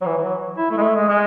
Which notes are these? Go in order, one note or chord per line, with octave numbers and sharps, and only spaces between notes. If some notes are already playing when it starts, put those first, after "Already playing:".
F#3
E3
E3
F#3
E4
A3
G#3
A3
G#3
G#3